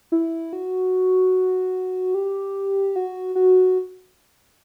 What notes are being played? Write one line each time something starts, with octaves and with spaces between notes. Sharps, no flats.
E4
F#4
G4
F#4
F#4